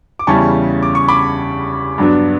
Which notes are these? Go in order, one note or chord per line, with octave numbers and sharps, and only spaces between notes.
D6
E2 C#3 G3 C#4 E4 A5 C#6
D6
C#6
B5 D6
G2 F#3 B3 D4